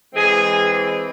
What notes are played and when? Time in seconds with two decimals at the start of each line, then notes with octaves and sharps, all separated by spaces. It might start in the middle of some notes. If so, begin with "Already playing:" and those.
0.14 E3 G#3 C4 G#4
0.72 G#4